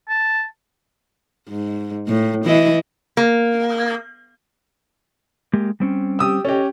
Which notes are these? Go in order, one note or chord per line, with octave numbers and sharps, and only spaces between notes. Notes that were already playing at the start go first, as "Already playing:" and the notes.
A5
G#2
A2
E3 E4 D#5
A#3
G#3 A#3 G4
G3 C4 C#4
G4 D#6 E6
C#4 G4 A4 D#5